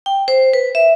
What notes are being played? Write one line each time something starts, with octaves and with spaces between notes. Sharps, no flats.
G5
C5
B4
E5